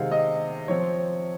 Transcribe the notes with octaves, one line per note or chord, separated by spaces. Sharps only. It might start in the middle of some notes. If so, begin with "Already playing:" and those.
Already playing: C3 D#3 G#3 C4 F5 F#5
D#5
F3 C4 C#5